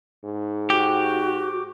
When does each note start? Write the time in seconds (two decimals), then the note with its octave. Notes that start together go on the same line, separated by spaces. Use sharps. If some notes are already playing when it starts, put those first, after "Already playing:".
0.24 G#2
0.70 F#4 G4